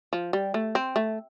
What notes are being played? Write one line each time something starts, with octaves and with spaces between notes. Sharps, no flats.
F3
G3
A3
C4
A3